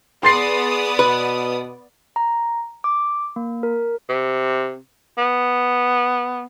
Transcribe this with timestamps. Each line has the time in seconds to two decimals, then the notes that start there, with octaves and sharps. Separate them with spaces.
0.23 B3 G#4 D5 C6 D#6 A6 C7
0.99 B2 B4
2.16 A#5
2.84 D6
3.36 A#3
3.63 A#4
4.09 C3
5.18 B3